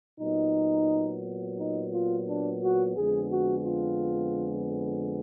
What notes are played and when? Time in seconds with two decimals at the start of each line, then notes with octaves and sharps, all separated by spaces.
0.20 A#2 F#3 B3 D#4
1.59 D#4
1.93 F4
2.28 D4
2.62 F#4
2.97 F2 D3 G#3 B3 G#4
3.32 F#4
3.66 F4